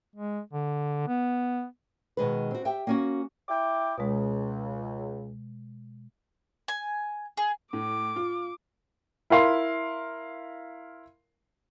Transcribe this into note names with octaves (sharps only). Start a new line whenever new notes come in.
G#3
D3
B3
B2 D#3 G#3 B4
C4 F#4
G4 E5 G5
A#3 C#4 F#4
E4 G5 D6
C#2 B2 G#3
G#5
G#4
A2 D6
F4
E4 A#4 F5 C6